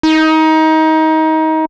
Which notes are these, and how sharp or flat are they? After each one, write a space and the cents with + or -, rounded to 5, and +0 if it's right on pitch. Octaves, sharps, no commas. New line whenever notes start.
D#4 +25